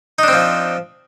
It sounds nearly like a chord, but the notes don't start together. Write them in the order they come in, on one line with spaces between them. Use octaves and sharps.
D#4 D4 C4 F3